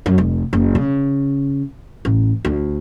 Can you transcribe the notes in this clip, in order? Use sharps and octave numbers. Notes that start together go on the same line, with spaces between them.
F#2
F1
F#1
C#3
A1
D2